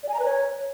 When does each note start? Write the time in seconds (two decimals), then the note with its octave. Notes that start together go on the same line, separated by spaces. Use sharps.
0.03 D5
0.09 G#5
0.14 A#5
0.19 B4
0.25 C#5